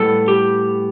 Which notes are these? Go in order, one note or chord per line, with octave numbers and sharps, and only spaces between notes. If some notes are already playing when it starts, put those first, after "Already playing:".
Already playing: A2 G3 B3 A4
G4